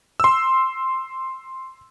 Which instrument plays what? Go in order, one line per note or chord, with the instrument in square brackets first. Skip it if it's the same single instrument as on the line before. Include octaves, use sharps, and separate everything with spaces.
[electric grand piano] C6 E6